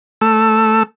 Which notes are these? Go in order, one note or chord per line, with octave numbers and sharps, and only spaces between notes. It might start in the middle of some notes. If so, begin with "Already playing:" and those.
A3 E6